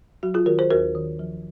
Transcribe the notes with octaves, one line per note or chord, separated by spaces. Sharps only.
F#3 F#4
F4 G#4
D#3 F#4 A#4
G#4 C5
D#2 F#4 A#4
D#3
F3